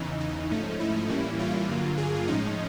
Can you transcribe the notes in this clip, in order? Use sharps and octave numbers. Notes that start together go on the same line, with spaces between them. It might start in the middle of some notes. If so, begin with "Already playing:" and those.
Already playing: E2 C#3 E3 D#4
D#4
G#2 F3 A3 C#4
E4
A2 E3 G3 A#3 C#4
F4
G2 D3 F#3 A#3
G#4
A2 F3 G#3 C#4 D#4